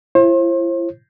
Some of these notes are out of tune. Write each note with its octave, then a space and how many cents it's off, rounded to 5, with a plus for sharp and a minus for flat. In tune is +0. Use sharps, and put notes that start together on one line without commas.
E4 +40 C5 +35